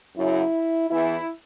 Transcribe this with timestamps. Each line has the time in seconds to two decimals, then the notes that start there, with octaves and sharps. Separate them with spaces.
0.16 F#2 C#3 F#3 E4
0.90 E2 E3 E4